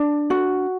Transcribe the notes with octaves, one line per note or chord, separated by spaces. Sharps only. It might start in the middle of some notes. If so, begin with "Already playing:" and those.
Already playing: D4
F#4